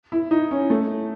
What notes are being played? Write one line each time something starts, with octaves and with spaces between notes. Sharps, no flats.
E4
D#4
C#4
A3